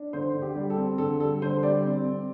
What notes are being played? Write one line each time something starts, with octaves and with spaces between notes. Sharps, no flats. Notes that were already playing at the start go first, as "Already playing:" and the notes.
Already playing: D4
D3 C5
D3
G4
G3
A4
C4
D3 A4
G3 A4
D3 C5
G3 D5
C4
C4